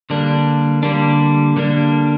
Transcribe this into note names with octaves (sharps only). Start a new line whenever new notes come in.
D3 G3 A#3 D4
D3 G3 A#3 D4
D3 G3 A#3 D4